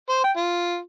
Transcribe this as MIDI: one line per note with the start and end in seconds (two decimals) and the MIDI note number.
0.09 0.22 72
0.24 0.32 79
0.37 0.78 65